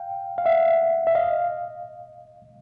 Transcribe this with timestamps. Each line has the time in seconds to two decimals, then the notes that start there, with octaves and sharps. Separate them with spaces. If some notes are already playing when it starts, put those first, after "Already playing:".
Already playing: F5 G5
0.38 F5
0.45 E5 F#5
1.07 E5
1.15 D#5 F5